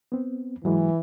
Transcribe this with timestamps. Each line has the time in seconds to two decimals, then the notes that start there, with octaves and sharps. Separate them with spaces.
0.12 B3 C4
0.64 G#2 E3 F#3 G#3